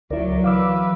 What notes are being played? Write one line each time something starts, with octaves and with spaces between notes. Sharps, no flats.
C#2 F#3 E4 A#4 D5
E3 B4 F5 D6 E6